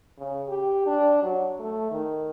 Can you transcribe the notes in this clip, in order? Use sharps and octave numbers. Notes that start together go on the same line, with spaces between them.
C#3
G4
D4
F#3
A3
D#3